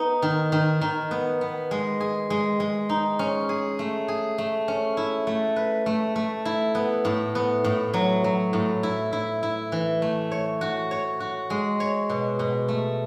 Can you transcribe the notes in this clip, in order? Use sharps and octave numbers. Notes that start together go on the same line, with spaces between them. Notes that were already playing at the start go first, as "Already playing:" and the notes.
Already playing: B3 D#4
D#3
D#3
D#3
B3
B3
G#3
G#4
G#3
G#3
D#4
C#4
G#4
A3
G#4
A3
C#4
E4
A3
B4
A3
A3
E4
B3
A2
B3
A2
F#3
F#3
A2
E4
E4
E4
E3
A3
C#5
F#4
C#5
F#4
G#3
C#5
B2
B2
A3